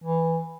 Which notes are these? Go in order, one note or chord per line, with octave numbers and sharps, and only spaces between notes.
E3